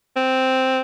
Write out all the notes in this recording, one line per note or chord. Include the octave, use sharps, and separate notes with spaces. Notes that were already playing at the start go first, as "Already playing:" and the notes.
C4